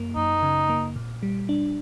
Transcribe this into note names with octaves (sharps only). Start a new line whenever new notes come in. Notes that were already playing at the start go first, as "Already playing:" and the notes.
Already playing: F#2 A#3
F#2 D#4
C#3
A#3
A#2
G3
D4